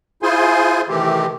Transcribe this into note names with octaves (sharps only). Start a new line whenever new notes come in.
E4 F4 G#4 C5 G#5 C6
C3 D#3 E3 A3 C4 G4